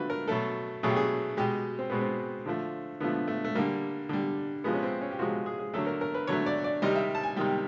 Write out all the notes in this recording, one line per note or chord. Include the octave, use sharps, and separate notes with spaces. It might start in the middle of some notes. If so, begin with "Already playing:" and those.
Already playing: D3 F3 A3 F#4 B4
A#4
B2 F#3 A3 A4
B2 F#3 A3 G#4
G4
G#4
B2 G#3 G4
C4
B2 G#3 B3
C4
D3 F3 A3
D3 F3 A3 B3
A3
A3
D3 G3 A#3
D3 G3
C3 F3 G#3 B3
C#4
C4
C#4
G4
C3 F3 G#3 F#4
G#4
G#4
D3 F#3 A3 A4
A#4
A#4
B4
D3 F#3 A3 C#5
D5
D5
C3 D#3 G3 D#5
E5
A5
G#5
C3 D#3 G3 G5